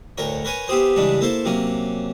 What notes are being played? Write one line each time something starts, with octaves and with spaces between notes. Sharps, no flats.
D2 A2 A#4 C#5
A#4 B4 C#5 G#5
B3 E4 G4 G#4 C5
G2 C#3 E3 G#3 D4 E4
A#3 E4 A4 C5
C3 F#3 A#3 C#4